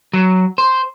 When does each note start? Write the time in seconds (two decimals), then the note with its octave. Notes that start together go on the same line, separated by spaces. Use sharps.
0.13 F#3
0.58 C5